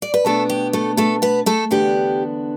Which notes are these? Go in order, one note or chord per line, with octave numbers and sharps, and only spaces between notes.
D5
B4
B2 A3 B3 D4 A4
G4
A3 A4
A3 A4
B3 B4
A3 A4
E2 D3 B3 D4 G4